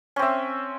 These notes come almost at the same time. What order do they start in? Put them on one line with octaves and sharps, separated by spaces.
C#4 C4 E5